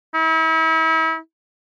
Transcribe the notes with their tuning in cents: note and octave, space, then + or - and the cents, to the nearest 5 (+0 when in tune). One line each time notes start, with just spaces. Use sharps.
E4 -40